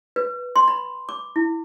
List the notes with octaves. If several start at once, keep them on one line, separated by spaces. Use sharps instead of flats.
B4
C6
B5
D6
E4